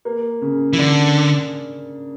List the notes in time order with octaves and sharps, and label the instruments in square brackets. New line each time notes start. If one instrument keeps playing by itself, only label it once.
[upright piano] A#3
C#3
[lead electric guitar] E3
[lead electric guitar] D3 [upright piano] D4